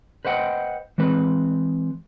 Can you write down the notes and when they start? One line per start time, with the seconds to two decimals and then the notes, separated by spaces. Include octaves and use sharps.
0.25 B4 C5 D#5 F#5 G5
0.98 E3 G#3 C4 B4